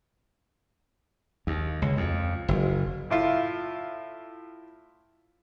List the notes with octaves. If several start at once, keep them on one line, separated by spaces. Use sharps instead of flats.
D#2
C#2
F2
F#1
A2 E4 F4